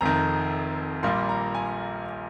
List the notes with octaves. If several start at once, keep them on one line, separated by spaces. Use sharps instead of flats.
F1 F2 D#3 A#5
A#1 A#2 G3 A#3 C6
A#5
G#5